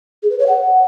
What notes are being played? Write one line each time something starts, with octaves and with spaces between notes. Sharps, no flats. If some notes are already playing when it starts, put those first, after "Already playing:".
G#4
B4
C#5
F#5